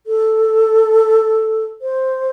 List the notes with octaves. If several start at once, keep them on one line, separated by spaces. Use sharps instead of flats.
A4
C5